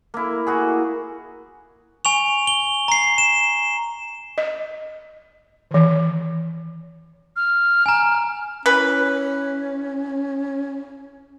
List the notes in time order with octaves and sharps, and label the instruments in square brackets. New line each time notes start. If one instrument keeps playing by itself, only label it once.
[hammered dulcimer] A#3 E4
E4 F#4 G#4
[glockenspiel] G#5 C#6 F7
G7
A#5 C7
E7
[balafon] D#5
D#3 E3
[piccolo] F6
[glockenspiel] G#5 A#5
[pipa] E3 B4 [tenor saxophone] C#4